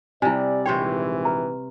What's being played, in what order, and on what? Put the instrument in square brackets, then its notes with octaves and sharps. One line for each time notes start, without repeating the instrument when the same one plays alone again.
[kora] C3 G3 [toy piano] E4 G#5 [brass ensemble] D5
[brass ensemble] A#1 G#2 E3 [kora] C3 C5 C#5 [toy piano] G5
[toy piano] B4 A#5